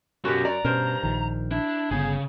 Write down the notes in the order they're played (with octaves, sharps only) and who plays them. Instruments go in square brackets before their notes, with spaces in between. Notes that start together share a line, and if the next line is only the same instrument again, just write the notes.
[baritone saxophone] F#2 [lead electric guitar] B2 C#4 [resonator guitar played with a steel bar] F#4 G4
[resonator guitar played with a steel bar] D5 [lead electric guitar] A#5
[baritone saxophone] G2 [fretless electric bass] B2 C#4 [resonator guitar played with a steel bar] A#4 C5
[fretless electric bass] A#1 D#3
[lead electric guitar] D4 [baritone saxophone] E4
[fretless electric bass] G1 B3 [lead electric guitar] C#3 [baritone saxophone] G#4